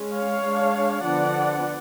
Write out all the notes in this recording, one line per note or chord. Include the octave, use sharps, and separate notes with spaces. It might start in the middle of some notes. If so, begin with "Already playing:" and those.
Already playing: G#3 C#4
C#5 F5
G#3 D4
D3 F3 B3 D4 D5 F#5